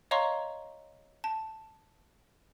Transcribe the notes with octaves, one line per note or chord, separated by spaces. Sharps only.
C#5 D#5 F5 A#5 C6 C#6
A5